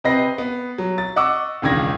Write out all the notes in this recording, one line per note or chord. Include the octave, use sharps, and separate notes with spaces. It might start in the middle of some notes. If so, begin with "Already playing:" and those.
C3 C4 B4 D#5 A#6 C7
B3
F#3
A6
D#5 F#5 C#6 D6 E6
E1 C#2 D#3 D4 G#6 A#6